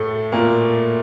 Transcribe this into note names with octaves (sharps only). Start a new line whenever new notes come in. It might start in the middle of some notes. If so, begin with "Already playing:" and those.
Already playing: A2 A3
A#2 A#3